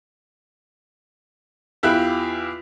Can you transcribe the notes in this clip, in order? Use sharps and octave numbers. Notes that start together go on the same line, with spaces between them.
E2 E4 F4 G4 F#6